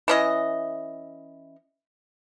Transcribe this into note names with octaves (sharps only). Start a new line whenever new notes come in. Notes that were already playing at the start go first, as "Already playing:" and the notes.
E3 C#4 D#5